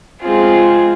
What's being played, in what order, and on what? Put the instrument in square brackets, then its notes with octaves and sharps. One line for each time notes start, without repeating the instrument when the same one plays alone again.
[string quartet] G#3 C4 F4 G#4